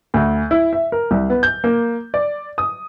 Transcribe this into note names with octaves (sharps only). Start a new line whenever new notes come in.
D2
E4
E5
A#4
C2
B3
G6
A#3
D5
D#6